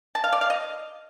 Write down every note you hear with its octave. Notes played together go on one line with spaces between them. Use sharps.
A5
F5
D5
F5
D#5